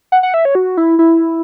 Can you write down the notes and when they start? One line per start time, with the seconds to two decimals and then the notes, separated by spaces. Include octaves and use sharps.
0.12 F#5
0.23 F#5
0.34 E5
0.45 C#5
0.55 F#4
0.77 E4
0.99 E4